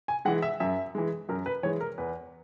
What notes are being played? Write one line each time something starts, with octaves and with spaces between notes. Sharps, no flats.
G#5
E3 G#3 F#5
E5
F#2 E5
E3 G#3
F#2 A#4
B4
E3 G#3 C#5
A#4
E2 B4